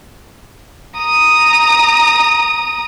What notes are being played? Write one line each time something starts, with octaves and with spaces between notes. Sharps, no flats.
A#5 D#6